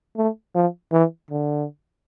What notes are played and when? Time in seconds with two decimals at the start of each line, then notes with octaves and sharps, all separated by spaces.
0.17 A3
0.55 F3
0.92 E3
1.31 D3